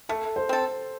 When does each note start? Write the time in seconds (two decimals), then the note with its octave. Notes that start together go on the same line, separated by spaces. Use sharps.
0.09 A3 A4
0.36 C5
0.49 C4 A4